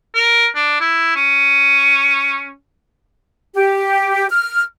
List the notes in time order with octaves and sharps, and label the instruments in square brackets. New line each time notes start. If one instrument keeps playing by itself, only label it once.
[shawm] A#4
D4
E4
C#4
[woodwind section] G4
F6